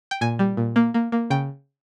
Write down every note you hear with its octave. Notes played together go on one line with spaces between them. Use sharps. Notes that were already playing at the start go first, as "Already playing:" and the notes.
G5
A#2 G#5
G3
A#2
A#3
A#3
A#3
C#3 G5